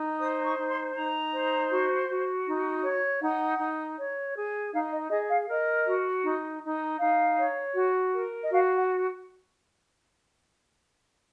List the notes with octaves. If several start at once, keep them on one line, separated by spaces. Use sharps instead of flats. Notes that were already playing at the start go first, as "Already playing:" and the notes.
Already playing: D#4
C5 D#6
C#6
D#4
C6
D#4 A#5
C5
F#4
F#4
D#4
C#5
D#4 F#5
D#4
C#5
G#4
D#4 F5
D#5
G#4 D#5
F5
A#4 D#5
F#4
D#4
D#4
D#4 F5
C#5
F#4
A#4
D#5
F#4 F5
F#5